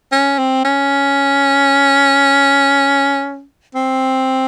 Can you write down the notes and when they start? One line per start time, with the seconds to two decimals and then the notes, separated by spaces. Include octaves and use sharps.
0.12 C#4
0.39 C4
0.64 C#4
3.75 C4